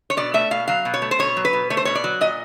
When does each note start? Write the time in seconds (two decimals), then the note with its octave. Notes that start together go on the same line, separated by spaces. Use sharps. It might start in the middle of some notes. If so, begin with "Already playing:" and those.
0.10 C#5
0.17 B2 D5
0.34 A3 E5
0.51 B2 F5
0.68 F#3 F5
0.85 B2
0.94 C#5
1.02 A3
1.11 C5
1.19 B2 C#5
1.37 F#3
1.45 B4
1.53 B2
1.70 A3 C#5
1.77 C5
1.85 B2 C#5
1.95 D5
2.04 F#3
2.21 A#2 D#5